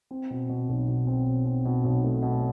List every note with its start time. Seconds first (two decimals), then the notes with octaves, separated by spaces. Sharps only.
0.11 C4
0.30 B2
0.49 B2
0.69 B1
0.87 B2
1.07 C4
1.26 B2
1.46 C4
1.65 B2
1.84 B1
2.04 A3
2.22 B2